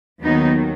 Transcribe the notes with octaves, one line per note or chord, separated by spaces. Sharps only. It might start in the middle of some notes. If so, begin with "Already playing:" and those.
D#2 D#3 F#3 B3 D#4